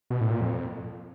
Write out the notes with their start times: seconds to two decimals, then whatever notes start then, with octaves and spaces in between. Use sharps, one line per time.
0.10 B2
0.21 A2
0.31 A#2
0.41 F2